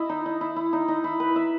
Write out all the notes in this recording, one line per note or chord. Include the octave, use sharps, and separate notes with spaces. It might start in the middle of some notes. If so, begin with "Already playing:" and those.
Already playing: E4 D#5
D#4
D#4
E4
E4
D#4
D#4
E4
B4
E5